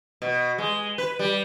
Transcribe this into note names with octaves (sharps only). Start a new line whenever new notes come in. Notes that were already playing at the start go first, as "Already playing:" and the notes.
B2
G#3
B4
G3